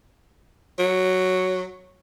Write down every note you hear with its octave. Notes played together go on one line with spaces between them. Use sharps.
F#3